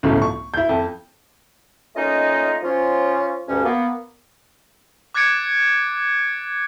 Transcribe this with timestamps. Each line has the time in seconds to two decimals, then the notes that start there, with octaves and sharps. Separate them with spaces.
0.03 G1 C#2 A2 C#3 F3
0.22 C#6
0.54 E4 G6
0.69 F2
1.95 A3 A#3 C#4 D#4 F4 D#5
2.63 F3 C#4 F4
3.48 D2 G2 C#4
3.64 A#3 B3
5.14 D6 F#6 G#6 A6 C#7 D7